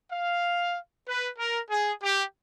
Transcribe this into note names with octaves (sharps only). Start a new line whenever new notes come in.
F5
B4
A#4
G#4
G4